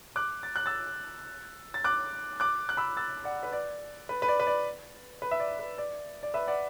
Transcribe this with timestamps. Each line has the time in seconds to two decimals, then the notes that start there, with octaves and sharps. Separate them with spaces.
0.16 D6 F#6
0.43 A6
0.56 F#6
0.66 E6 A6
1.74 A6
1.84 D6 F#6
2.40 D6 F#6
2.69 F#6
2.77 B5 E6
2.97 E6 A6
3.24 D5 F#5
3.43 B4
3.52 D5
4.09 B4
4.22 B4
4.28 D5
4.40 B4
4.47 D5
5.22 B4
5.31 E5
5.40 D5
5.59 B4
5.78 D5
6.23 D5
6.34 B4 E5
6.47 D5 F#5